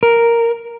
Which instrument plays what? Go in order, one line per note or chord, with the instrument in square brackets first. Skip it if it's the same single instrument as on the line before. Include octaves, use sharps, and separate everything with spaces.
[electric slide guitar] A#4